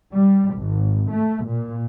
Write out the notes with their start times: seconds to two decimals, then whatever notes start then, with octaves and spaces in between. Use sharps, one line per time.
0.16 G3
0.56 G#1
1.13 A3
1.49 A#2